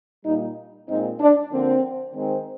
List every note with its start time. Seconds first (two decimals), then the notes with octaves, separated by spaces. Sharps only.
0.24 A#2 G3 A#3 D#4
0.88 A#2 G#3 C4 D#4
1.20 D4
1.51 D3 F3 A#3 C4
2.15 D#3 G#3 C4